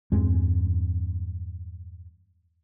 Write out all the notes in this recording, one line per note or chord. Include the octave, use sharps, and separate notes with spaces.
E2 G2 G#3 C4